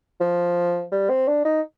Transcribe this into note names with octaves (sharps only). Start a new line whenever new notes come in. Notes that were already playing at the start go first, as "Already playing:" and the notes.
F3
G3
C4
D4
D#4